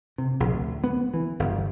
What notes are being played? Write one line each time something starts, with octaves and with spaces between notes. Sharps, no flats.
C3
A#1
D2
B3
E3
G1